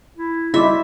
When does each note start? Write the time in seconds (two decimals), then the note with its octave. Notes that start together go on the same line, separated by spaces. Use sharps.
0.17 E4
0.54 G3 E4 F#4 D#5 E5 D6